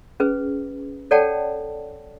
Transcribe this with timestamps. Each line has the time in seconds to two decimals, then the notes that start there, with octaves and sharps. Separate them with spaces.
0.20 C#4 G#4 B4
1.11 A4 C#5 D5 F#5 G5 A5